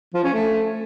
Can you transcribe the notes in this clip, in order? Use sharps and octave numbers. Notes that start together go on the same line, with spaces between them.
F3
C#4
A3